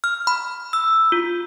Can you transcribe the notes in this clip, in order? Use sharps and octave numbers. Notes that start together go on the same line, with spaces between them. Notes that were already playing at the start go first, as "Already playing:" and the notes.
F6
B5
E6
F4